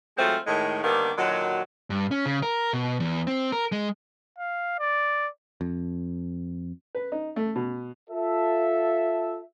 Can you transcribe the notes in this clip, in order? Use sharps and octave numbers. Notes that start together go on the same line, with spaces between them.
F#3 G#3 A3 C4 F4 C5
A2 D#3 G#3
D3 D#3 G3 A#3 B3
A#2 D3 D#3 F#3
G2
C#4
C#3
A#4
B2
E2
C4
A#4
G#3
F5
D5
F2
B4
D#4
A3
B2
F4 A4 E5